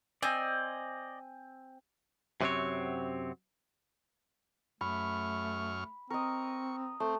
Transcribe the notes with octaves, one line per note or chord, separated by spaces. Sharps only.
C4 D5 D#5 G#5
F#2 C3 F#3 A#3 C4 C#5
F#2 A3 B5 C#6 F6
C4 A#4 D#5 C#6
A3 C4